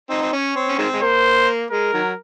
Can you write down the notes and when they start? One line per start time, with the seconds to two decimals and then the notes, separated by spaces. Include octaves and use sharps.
0.10 C4 D#4
0.22 C4
0.33 C#4 C#5
0.56 C4
0.69 C#4
0.79 D#3 G#3 C4
0.93 G#3
1.02 A#3 C5
1.71 G#3 A#4
1.93 D#3 F#3